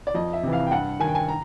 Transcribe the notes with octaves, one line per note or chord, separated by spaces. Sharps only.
D5
F2 D#5
E5
C3 E3
F5
G5
G2 F#5
D#3 G#5
G5
G#5
A#5